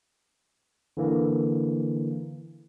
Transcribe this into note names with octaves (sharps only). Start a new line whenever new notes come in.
D3 E3 A#3